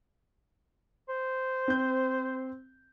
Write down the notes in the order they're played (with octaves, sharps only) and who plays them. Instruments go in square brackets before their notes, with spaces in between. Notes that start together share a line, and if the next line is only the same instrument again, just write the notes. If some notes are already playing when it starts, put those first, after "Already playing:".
[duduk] C5
[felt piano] C4 G6